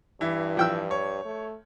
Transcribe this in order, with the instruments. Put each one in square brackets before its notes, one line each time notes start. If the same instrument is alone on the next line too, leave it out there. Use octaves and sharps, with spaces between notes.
[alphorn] G2 [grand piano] E3 E4
[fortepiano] F3 G5 E6
[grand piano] C#5
[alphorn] A3